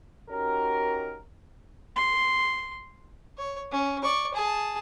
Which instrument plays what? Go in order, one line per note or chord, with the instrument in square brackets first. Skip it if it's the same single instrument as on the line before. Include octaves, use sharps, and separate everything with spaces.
[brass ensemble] C#4 D#4 F#4 G4 A#4
[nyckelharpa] C6
[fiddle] C#5
C#4
D5 C#6
G#4 A5